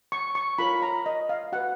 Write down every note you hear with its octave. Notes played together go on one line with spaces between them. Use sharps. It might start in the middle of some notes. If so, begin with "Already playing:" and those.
C#6
C#6
F4 A#4 C#5 B5
A#5
D#5
F5
F#4 B4 F#5